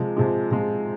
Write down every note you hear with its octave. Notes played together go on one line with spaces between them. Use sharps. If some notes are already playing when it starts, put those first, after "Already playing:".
Already playing: C3 F3 G#3
C3 F3 G#3
C3 F3 G#3